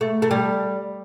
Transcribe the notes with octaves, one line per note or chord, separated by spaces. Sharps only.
A3
A3
G3